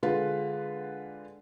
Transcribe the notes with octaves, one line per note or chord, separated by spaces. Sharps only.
D3 G#3 F4 B4